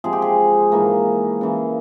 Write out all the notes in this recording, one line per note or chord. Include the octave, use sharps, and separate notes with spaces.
C3 F3 G#3 G#4
G4
G#4
G#2 E3 A#3
C#3 E3 A#3